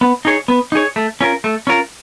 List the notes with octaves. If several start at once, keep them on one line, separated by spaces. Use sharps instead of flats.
B3
D#4 G#4 C#5
B3
D#4 G#4 C#5
A3
C#4 F4 A#4
A3
C#4 F4 A#4